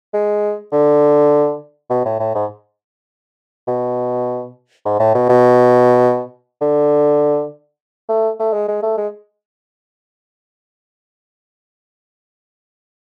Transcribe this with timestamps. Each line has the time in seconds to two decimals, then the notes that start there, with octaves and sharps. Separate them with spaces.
0.13 G#3
0.72 D3
1.90 B2
2.05 A2
2.20 A2
2.35 G#2
3.68 B2
4.86 G#2
5.00 A2
5.14 B2
5.29 B2
6.62 D3
8.09 A3
8.40 A3
8.53 G#3
8.68 G#3
8.83 A3
8.97 G#3